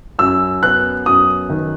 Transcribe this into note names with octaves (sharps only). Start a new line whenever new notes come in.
F#2 E6
B3 F#6
F#2 D#6
D#3